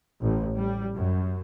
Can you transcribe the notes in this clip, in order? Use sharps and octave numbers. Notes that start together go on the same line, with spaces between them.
A1
G3
F#2